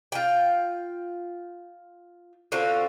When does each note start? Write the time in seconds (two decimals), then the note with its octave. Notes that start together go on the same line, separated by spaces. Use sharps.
0.12 F4 G5
2.52 D3 C4 F4 F#4